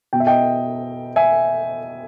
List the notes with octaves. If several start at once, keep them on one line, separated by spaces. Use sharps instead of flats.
B2 G5
E5
D#5 G5
E5 G#5